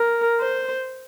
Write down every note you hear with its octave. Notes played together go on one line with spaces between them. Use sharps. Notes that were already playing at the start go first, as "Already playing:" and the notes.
Already playing: A#4
C5